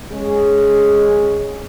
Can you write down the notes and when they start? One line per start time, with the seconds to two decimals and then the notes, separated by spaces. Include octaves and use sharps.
0.12 G#3 C#4 G#4